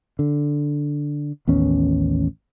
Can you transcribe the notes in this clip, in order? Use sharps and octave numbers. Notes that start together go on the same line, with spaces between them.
D3
A1 D#2 B3 C#4